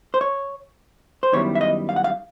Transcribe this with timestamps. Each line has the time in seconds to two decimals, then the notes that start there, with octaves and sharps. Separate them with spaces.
0.14 C5
0.21 C#5
1.23 C5
1.32 F#2 D#3 G3 B3 E4 C#5
1.55 E5
1.61 D#5
1.89 F5
1.96 F#5
2.04 F5